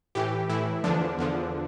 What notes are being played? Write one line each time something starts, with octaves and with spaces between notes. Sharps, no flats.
A2 E3 G4
A2 E3 E4
E2 D3 F3 D4
E2 D3 F3